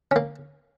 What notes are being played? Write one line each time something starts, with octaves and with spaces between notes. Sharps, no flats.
C#4
A#3